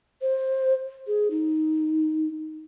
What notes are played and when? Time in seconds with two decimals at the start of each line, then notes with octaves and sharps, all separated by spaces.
0.22 C5
1.07 G#4
1.31 D#4